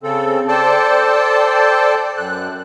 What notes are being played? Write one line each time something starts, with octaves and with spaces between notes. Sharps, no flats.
C#3 C4 A4
A4 C5 D5 G5 A5
F#2 F#6